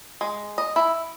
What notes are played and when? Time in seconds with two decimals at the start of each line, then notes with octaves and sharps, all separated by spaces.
0.21 G#3
0.58 D#5
0.76 E4